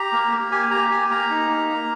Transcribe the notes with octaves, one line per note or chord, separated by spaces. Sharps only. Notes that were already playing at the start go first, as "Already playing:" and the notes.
Already playing: G4 A#5
A#3
A#3
G4 G#5
G4 A#5
G4 G#5
A#3 A#5
D#4
A#3
A#3